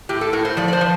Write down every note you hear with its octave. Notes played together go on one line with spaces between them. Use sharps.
A2 G4
A4
A2 A#4
C5
F3 D5
D5
C5
F3